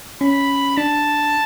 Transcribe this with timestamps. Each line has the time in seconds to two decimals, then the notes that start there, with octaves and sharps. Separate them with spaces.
0.21 C#4 B5
0.77 D4 A5